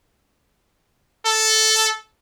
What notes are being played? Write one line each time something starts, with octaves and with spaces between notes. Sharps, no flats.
A4